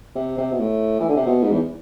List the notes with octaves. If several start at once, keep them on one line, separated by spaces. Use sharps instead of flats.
C3
C3
B2
A2
E3
D3
C3
B2
G#2
E2